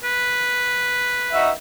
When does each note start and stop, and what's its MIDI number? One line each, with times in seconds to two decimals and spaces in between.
0.04 1.54 71
1.33 1.50 63
1.33 1.50 66
1.33 1.50 76